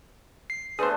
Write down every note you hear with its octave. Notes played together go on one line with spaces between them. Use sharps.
C7
D3 A3 B3 G#4 B4 C5